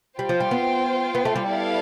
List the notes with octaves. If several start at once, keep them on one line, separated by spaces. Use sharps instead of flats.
G3 F4 C5 G5
F3
G3
B3
B3
A3
G3
B3 E4 A4 D5 F5